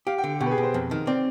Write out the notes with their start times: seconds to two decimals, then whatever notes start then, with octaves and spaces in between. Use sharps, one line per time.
0.07 G4 F5
0.18 G5
0.24 D3
0.40 B2 G4
0.46 B4
0.51 G#4
0.58 B2
0.63 C5
0.74 F2
0.91 D#3
1.07 C4 D5